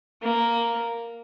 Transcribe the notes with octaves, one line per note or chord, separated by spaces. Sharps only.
A#3